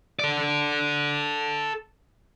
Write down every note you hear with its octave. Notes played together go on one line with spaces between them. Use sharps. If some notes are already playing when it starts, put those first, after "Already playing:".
A4 D5